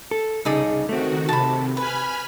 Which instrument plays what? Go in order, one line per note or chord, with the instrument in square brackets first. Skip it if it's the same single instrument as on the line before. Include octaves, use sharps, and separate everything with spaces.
[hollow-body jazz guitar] A4
[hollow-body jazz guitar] C2 D#4 G#4 [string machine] C#3 [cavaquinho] A4 D5 D#6
[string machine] D#3 F#4 [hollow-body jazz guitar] A3 C4
[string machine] C3 [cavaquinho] A5 B5
[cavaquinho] B4 [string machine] G#5 B5 F6